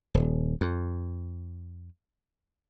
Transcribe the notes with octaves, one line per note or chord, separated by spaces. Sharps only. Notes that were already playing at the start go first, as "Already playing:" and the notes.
D#1
F2